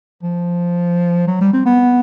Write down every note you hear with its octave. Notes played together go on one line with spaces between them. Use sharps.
F3
F#3
G3
C4
B3